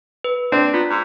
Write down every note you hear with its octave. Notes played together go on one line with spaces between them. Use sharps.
B4
C4 D4
B3 F4
G#2